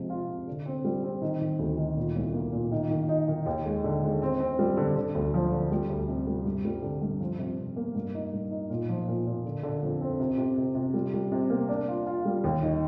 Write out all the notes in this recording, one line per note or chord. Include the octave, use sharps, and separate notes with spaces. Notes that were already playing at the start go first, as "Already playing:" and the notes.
Already playing: C3 F3 G#3
F4
C3
D3
C4
G3
C4
D#3
D#3
D2
D#3
A#2
C2
A#3
A#2
D#3
D#3
D#4
D#3
D#2
G#3
D3
G#3
C4
C4
G3
D3
D3
D2
F3
D3
G3
D2
C3
G3
G2
G3
D3
G2
F3
C3
C3
A#3
G2
D#4
G2
D#4
A#2
F3
A#2
A#2
D3
D3
F2
C4
C3
C3
C3
C3
G3
G3
C3
A#3
D4
F4
F4
G3
D#2
D#3